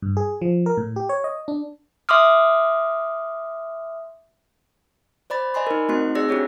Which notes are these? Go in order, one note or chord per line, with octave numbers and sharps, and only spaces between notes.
G2
G#4
F3
A#4
A2
G4
C#5
D#5
D4
E5 C6 D6 D#6 F6
C5 D5 B5 A6
D5 D#5 G#5 B5 C6
D#4 A#4
A3 C4 D#4 F#4 D#5 C6
C4 G#4 D5 E6 A#6
D4 E4 F#4 G4 C#5